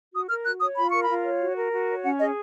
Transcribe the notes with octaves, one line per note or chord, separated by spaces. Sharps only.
F#4 D#6
A#4 F6
F#4 F#6
C#5 D#6
F4 B5
A#4 C#6
B5
F4
C#5
F#4
A#4
F#4
C#5
C#4 F#5
G#4 D#5